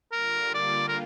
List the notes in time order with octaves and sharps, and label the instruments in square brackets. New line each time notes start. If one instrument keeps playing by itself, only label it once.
[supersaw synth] D3 G3 A#3 F4 [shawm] A#4
[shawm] D5
A#4